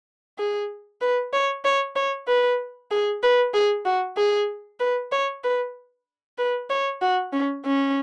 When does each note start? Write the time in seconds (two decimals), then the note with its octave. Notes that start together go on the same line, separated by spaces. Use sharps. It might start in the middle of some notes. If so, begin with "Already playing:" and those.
0.39 G#4
1.02 B4
1.34 C#5
1.65 C#5
1.96 C#5
2.28 B4
2.91 G#4
3.23 B4
3.54 G#4
3.86 F#4
4.17 G#4
4.80 B4
5.12 C#5
5.44 B4
6.38 B4
6.70 C#5
7.02 F#4
7.33 C#4
7.65 C#4